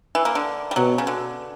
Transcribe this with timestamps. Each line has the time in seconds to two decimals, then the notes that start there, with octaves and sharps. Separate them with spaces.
0.15 E3
0.25 A#3
0.35 D3
0.71 G3
0.76 B2 F#3
0.98 C#3
1.07 D3